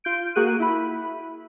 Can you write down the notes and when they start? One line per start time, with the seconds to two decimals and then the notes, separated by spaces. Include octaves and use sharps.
0.04 F4 G6 D7
0.35 A#3 F#4 G#4 F#6 D#7
0.60 E4 B5